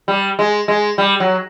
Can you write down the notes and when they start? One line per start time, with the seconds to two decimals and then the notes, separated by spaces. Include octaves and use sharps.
0.08 G3
0.39 G#3
0.68 G#3
0.98 G3
1.20 F#3